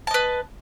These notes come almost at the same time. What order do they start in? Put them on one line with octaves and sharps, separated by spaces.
A5 D#5 B4